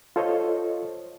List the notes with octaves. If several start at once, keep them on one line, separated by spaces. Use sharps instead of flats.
F4 A4 C5 C#5 D#5